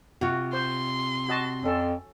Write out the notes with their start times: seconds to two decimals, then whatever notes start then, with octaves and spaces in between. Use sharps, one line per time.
0.21 C3 F4 F#4
0.53 C5 C6
1.28 F#4 D#5 A5
1.63 F2 C#4 A4